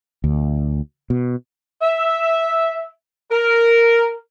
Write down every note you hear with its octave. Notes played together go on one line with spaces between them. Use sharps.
D2
B2
E5
A#4